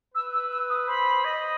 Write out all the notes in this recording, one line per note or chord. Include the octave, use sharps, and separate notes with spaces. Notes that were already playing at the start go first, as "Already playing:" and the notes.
B4 E6
E6
E6
D#6
C5 B5
D#5